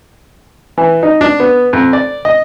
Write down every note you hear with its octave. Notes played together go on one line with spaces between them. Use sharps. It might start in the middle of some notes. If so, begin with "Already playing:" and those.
E3
D#4
D4
B3
F2
D5
D#5